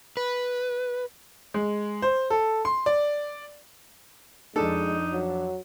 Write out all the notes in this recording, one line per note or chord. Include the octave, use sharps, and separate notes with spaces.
B4
G#3
C5
A4
C6
D5
F2 G#3 D4 D#4 A4
F#3